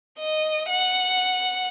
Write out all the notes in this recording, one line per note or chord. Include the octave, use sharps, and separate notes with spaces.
D#5
F#5